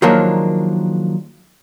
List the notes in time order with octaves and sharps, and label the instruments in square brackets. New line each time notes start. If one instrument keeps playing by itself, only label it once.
[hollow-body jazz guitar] D#3 F3 F#3 G#3 A#3 D4